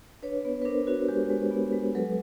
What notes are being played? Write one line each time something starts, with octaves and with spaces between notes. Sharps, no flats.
D4 B4 C#5
B3
B4
D4 A#4 C5
D4 F#4
G#3 G4
G#3
B3
G#3
F#3 A4 B4